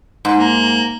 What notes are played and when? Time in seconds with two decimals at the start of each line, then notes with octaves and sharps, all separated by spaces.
0.25 G#2
0.38 A#3